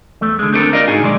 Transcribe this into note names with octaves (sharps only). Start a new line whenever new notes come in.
E2 A3
D3 G#3
A3 C4 D4 D#4 A4 A#4
F4 A#4 D5 D#5 F5
G#2 D#4 F#4 G#4 G#5
B1 G2 D#3 G#3 D5